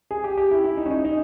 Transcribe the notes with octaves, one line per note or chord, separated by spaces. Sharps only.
G#4
G4
G4
E4
E4
D#4
C#4
D#4
D#4